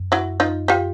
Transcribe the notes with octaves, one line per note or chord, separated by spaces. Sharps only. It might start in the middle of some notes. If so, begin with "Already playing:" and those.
Already playing: F#2
E4 F#4
D#4 F4
F4 G4